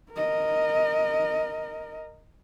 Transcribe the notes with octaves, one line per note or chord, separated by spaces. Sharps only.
A#4 D#5